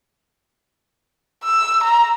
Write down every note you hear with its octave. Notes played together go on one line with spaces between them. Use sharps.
E6
A#5